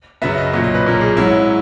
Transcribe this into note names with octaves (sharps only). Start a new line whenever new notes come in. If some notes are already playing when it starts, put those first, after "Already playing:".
F#2 C#3 F#3 B3 E5
D#5
B1 A#2 F#3 C#4 D#5
D#5
B4
B1 A#2 A#3 C#4
G#4
G#2 F#3 C#4 E4